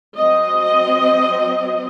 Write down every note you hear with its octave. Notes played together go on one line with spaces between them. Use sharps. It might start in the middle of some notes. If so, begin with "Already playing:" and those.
F#3 C4 D#5